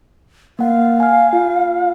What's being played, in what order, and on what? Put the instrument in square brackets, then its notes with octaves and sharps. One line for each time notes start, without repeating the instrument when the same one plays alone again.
[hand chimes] A#3 F#5 [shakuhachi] F5
[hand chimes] G#5 F6
F4